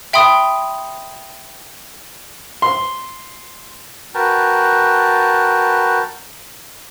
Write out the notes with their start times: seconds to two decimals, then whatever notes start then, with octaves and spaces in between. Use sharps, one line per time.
0.13 E5 G5 B5 C6 D#6
2.62 C6
4.15 F#4 A#4 B4 G5 A5